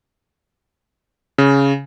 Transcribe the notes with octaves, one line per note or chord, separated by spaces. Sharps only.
C#3